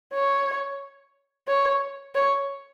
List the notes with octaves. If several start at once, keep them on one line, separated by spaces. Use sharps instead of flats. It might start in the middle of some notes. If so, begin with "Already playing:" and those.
C#5
C#5
C#5